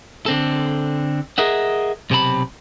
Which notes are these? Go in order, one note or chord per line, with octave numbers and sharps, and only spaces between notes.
D3 C4 A4
G#4 A#4 D#5 E5 F#5
B1 C3 C4 A5 B5